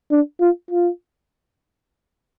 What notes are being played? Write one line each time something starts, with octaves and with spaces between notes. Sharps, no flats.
D4
F4
F4